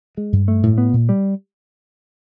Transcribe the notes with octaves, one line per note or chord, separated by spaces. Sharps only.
G#3
G2
A3
A2
B3
A#2
G3